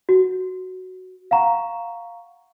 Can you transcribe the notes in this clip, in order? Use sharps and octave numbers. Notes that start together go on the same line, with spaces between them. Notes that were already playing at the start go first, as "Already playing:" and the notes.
F#4
F5 F#5 A#5 C#6